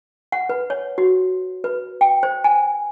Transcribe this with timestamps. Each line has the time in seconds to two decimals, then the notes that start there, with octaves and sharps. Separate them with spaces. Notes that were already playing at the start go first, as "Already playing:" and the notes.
0.32 F#5
0.49 B4
0.70 C#5
0.98 F#4
1.64 B4
2.01 G5
2.23 C5
2.44 G#5